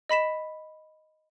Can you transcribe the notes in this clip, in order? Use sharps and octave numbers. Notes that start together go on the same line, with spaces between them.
D#5 B5 B6 E7